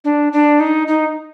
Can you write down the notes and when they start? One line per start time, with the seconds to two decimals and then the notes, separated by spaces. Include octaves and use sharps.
0.04 D4
0.33 D4
0.60 D#4
0.88 D#4